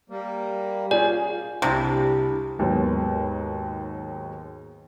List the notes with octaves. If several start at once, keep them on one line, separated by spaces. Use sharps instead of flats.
G3 A#3
C#4 F4 G#4 D5
C2 C3 D4 E4 G4
D#2 G#2 D#3 F#3 B3